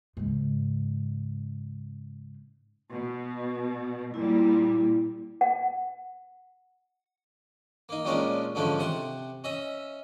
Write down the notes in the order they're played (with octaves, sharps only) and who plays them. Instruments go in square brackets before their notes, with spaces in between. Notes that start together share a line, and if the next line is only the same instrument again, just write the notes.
[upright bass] G#2 C#3
[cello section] B2
[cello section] A#2 G3 [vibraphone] E4
[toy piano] F#5
[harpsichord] A#3 D#4
A#2 G3 G#3 C#4 D4 A#4
G#2 D3 F3 A3 C#4 D4
C3 F#5 A5 C6
C#4 D#5 E5